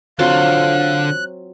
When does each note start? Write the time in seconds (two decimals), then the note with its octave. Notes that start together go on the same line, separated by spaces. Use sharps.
0.19 D3 F#3 C4 F4 F5 C6 F#6